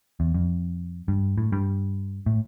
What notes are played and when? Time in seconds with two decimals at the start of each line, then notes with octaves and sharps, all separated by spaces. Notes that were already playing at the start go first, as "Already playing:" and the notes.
0.20 E2
0.34 F2
1.08 G2
1.38 A2
1.52 G2
2.26 A2